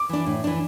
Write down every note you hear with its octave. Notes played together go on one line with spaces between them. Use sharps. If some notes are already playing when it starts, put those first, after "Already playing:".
Already playing: D6
E3 D4
A2
E3 D4